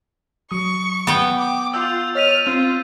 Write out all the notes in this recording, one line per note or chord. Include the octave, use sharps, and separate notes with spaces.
F#3 C#6 D#6
B3 G5
D6
F4 E6 G6
C#5 D#5 F6 A6 B6 D#7
C4 F4